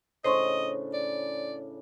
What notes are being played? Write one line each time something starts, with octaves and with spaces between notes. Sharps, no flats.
A2 C#3 D4 C5 D#5 C6 C#6
D5